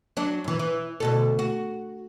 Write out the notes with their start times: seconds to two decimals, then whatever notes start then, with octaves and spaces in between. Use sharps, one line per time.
0.17 F#3 D4
0.44 F#2 E3
0.59 E3
1.00 D2 B2 A4
1.39 F#4